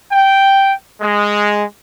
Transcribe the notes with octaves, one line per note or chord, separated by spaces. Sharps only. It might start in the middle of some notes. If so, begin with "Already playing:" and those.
G5
G#3